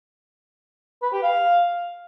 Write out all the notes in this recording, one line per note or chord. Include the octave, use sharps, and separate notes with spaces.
B4
G4
F5